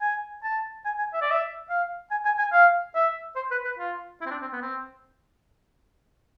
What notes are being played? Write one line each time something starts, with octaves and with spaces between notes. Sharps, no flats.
G#5
A5
G#5
G#5
E5
D5
E5
F5
G#5
G#5
G#5
F5
E5
C5
B4
B4
F4
E4
C4
D4
C4
B3
C4